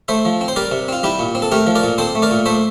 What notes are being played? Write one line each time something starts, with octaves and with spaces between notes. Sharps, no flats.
A3 C5 E5
F3
C4
C5
G3 A#4 D5
C3
C4 F4
G3 E4 G4
A#2
C4
A4
A3 G4 A#4
F3
A#4 D5
A#2
C4 A4 C5
A3
A#4 D5
A#2
A3 C5 E5